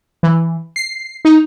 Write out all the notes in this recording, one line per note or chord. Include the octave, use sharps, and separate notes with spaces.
E3
C7
D#4